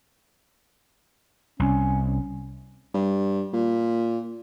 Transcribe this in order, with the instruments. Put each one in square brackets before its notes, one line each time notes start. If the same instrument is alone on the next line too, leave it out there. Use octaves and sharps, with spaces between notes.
[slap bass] C2 [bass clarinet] C#4
[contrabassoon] G2
A#2